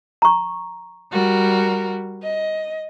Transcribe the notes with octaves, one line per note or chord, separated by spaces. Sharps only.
A#5 C#6
G3 F#4 A#4
D#5